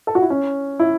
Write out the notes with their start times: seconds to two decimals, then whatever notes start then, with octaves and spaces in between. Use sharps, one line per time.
0.07 A4
0.15 F#4
0.22 E4
0.30 C#4
0.80 E4